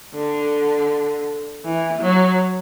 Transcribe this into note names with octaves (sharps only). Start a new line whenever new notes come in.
D3
E3
F#3